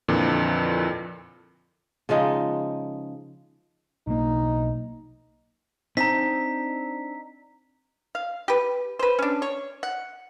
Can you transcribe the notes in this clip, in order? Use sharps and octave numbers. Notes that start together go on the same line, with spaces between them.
F2 A#2 D3 E3
C#3 F3 G#3 D#4
B1 A#3 D#4
C4 D4 D#4 A#5 B6
F5
G4 B4
B4 C5
C#4 D4
C#5
F#5